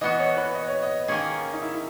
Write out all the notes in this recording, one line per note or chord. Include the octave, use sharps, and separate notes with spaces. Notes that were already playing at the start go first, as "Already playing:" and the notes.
E3 B3 F#4 D#5
C#5
B4
D#5
C#5
D#5
D#3 A#3 C#4 G#4
D#4
E4
E4